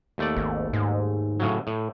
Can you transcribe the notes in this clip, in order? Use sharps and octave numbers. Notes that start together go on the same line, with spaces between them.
D#2 A3 D5
G#1
G#2
A2 C#3 F#3
A2